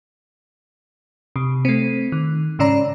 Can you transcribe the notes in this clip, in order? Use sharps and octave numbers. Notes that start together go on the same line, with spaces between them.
C3
A3 C4
D#3
G#2 C#3 C#4 D5 A#5